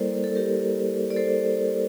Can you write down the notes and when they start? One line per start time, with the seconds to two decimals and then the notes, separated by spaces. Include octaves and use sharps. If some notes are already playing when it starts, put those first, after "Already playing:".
Already playing: G3 A#3 E4 A4 A#4 C5 D5
0.24 A4
0.35 G4 A#4
1.11 D5
1.17 A4 C5